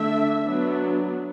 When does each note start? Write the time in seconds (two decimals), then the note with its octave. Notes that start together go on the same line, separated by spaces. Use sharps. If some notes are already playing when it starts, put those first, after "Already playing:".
Already playing: D3 A3 D4 E5
0.42 F#3 B3 D4